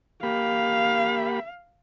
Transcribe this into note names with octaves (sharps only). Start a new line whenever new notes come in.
A#3 G4 F5 B5